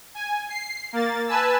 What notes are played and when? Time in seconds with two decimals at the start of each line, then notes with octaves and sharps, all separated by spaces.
0.15 G#5
0.49 C7
0.93 A#3 A6
1.27 B4 G#5 A5 E6